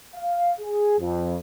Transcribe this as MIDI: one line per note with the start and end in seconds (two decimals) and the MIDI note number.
0.16 0.52 77
0.60 0.99 68
0.99 1.36 41